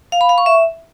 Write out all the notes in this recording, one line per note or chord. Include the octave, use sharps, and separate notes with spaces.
F5
B5
F5
C#6
E5